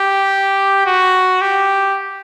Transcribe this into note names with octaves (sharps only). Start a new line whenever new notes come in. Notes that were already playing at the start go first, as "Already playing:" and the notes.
Already playing: G4
F#4
G4